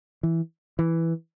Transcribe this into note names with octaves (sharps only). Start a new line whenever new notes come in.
E3
E3